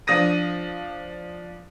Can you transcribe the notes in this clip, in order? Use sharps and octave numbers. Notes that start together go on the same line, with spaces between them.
F3 D4 D#6 A#6 D#7